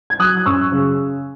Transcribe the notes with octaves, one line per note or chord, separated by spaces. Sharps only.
G#6
F#3 D#6 F#6
F#6
F#2 C#6 E6
C#3